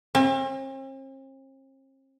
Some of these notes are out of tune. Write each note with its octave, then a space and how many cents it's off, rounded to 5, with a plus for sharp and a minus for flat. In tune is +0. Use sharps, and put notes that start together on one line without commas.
C4 +45